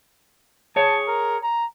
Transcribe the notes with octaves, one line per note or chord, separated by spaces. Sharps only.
G#4 C#5 A5
A#4
A#5